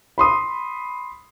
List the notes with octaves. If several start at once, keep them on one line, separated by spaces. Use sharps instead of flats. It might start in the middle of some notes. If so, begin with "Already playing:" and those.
B5 C6 D#6